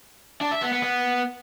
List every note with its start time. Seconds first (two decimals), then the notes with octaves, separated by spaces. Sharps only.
0.41 D4
0.52 E5
0.62 B3
0.73 B3
0.83 B3